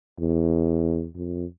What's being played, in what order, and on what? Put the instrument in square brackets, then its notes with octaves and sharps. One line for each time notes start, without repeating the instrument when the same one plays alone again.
[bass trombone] E2
F2